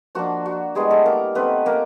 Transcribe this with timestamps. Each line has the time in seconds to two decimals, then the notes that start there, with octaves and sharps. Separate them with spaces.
0.15 F3 A#3 D4 F#4
0.46 F#4
0.75 G3 G#3 B3 E4 G#4
0.90 A3 A4
1.06 A#3 A#4
1.35 A3 B3 C4 D#4 B4
1.66 A#3 A#4